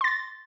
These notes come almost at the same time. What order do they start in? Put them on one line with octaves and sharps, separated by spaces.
C6 A6 A#6